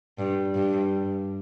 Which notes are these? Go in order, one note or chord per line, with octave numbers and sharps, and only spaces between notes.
G2
G2